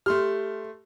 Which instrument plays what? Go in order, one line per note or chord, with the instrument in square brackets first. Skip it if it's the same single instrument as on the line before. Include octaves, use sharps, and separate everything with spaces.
[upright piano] A3 C6 F6 [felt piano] G4